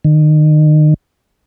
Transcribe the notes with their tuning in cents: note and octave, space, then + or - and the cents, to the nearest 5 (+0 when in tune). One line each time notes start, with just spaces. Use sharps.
D#3 -30